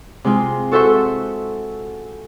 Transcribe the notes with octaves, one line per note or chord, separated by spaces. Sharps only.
C3 G#3 F4
F#4 A4 C5 E5 C#6